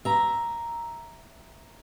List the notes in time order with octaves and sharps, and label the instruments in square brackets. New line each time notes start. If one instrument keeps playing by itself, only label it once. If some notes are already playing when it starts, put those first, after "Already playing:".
[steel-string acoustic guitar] E5 A#5